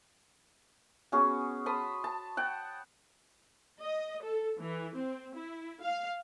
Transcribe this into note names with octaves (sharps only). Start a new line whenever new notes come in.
B3 C#4 F#4 G#4
A5 B5 C6 D#6
A5
F#5 G5
D#5
A4
E3
C4
E4
F5